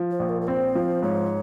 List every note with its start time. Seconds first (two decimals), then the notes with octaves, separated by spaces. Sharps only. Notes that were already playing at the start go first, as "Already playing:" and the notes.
Already playing: F3
0.11 C5
0.19 A#1
0.29 A#4
0.41 A#4
0.47 C4 C5
0.75 F3
1.02 G#2 C#5